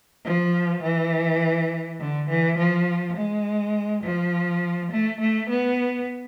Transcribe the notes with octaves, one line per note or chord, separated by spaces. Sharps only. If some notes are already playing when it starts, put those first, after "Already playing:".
F3
E3
D3
E3
F3
G#3
F3
A3
A3
B3